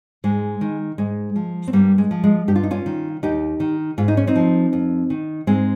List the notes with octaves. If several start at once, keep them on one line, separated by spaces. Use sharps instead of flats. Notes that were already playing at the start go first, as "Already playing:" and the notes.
G#2 G#3
D#3
G#2 G#3
F3
C4
G2 G3 A#3
G#3
F3
G#3
G2 G4
F4
D#4
C#4 F4
D#3
D#2 D#4 G4
D#3
G#2 F4
D#4
C#4
C4 D#4
F3
F2
D#3
G#2 G#3 C4